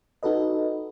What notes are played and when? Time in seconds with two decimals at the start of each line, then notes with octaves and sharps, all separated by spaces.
0.23 D#4 F#4 A4 B4 D#5